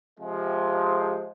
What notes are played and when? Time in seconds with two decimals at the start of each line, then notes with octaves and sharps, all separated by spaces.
0.19 C3 F3 G#3